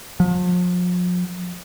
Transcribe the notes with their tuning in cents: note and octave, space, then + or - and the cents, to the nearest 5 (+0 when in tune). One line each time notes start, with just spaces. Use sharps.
F3 +40